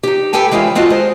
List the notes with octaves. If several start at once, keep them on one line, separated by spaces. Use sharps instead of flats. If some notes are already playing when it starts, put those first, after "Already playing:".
D#4 G4
G4 A4 B4 G5 G#5
E3 G#3 A3 C4 C#4 F4
C4 F4 F#4 A4 D#5
G#3 C5